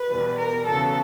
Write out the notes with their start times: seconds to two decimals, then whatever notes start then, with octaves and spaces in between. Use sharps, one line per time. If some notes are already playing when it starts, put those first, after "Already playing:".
Already playing: B4
0.08 E2 B2 G3
0.37 A#4
0.66 E2 C#3 F#3 A4